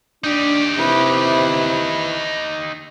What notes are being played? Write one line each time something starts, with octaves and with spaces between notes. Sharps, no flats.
D4 D#4 G4
C3 E4 B4